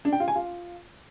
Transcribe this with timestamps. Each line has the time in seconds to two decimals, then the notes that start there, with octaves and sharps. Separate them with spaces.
0.05 D4
0.13 G5
0.20 F4
0.28 G#5
0.35 F4